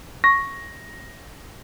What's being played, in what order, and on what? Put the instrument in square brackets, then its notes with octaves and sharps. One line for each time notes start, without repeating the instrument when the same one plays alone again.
[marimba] C#6 [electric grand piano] A#6